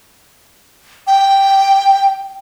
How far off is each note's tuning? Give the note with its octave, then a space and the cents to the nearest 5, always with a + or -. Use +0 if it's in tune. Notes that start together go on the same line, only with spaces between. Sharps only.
G5 +0